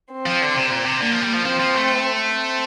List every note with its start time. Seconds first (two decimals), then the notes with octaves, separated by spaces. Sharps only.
0.12 C4
0.26 F3
0.42 D3
0.56 C3
0.71 A#2
0.86 C3
1.00 D3 A#3
1.12 F3
1.22 G3
1.34 F3
1.45 F3 C4
1.60 F3
1.75 A3
2.33 C4